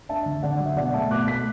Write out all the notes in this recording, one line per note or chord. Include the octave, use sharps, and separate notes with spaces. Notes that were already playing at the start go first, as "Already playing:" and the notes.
D4 E5 A5
D3
D3 D5 F#5
F#3
E5
B2 D5 F#5
A3 E5 A5
B2 D6 F#6
A3 F#6 B6